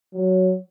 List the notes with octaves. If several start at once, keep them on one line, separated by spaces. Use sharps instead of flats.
F#3